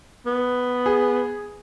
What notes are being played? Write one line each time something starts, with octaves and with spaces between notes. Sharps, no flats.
B3
G#4